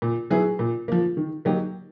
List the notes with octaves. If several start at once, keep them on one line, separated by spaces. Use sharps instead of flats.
A#2
F#3 B3 E4 G#4
A#2
F3 A#3
D#3
F#3 A#3 D#4 G4